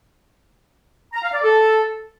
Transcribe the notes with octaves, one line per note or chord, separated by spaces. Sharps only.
A#5
F5
D5
A4